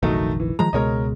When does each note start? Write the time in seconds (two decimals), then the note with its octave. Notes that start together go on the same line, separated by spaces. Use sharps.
0.03 F1 A#1 D#3 F#3 A3 D#4
0.40 E3
0.59 D#3 F3 G#3 A#5
0.73 C#2 B2 G#3 A#4 C#5 D#5